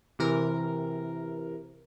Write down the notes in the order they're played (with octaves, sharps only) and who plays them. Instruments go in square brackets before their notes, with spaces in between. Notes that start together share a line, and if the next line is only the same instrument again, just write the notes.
[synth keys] C3 E3 A#4